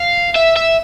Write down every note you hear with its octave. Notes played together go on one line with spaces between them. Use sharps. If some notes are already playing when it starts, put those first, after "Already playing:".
Already playing: F5
E5
E5